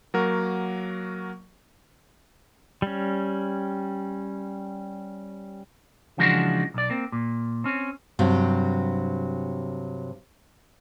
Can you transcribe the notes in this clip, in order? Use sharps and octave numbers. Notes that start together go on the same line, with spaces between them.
F#3 A#3 F#4 A#4
G3 C#4
C#3 E3 F3 G#3 D4 F#4
B1 D5
A#3 C4
A#2
C4 C#4
G2 C3 F#3